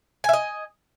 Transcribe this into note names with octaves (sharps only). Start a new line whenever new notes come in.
D#5 E5 G#5